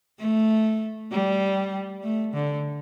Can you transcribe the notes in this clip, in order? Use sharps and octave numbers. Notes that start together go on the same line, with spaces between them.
A3
G3
A3
D3